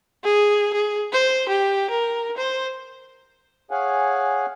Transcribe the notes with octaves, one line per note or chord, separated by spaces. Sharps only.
G#4
G#4
C5
G4
A#4
C5
G#4 C#5 F5 F#5 G#5